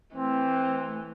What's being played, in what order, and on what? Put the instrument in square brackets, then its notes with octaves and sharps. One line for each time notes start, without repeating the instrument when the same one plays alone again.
[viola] E3 A3 [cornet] C4